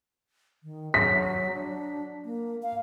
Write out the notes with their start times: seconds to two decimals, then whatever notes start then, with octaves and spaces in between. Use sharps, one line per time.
0.63 D#3
0.94 F#3 B6
1.53 D4
2.25 A#3
2.63 F5